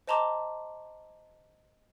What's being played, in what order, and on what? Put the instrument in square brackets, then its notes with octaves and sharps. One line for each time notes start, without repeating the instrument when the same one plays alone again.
[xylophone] C5 D#5 A5 A#5 C6 D6